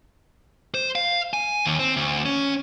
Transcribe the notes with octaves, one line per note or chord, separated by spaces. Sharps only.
C5
F5
G#5
D#2
C4
D2
C#4